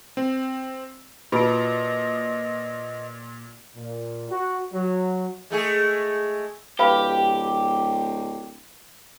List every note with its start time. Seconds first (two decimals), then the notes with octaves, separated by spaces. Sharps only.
0.17 C4
1.32 A#2 F4 F#4 B4 D#5 A5 D7
3.75 A#2
4.30 F#4
4.73 F#3
5.50 G#3 A3 G#4
6.79 D1 G4 B4 F5 B5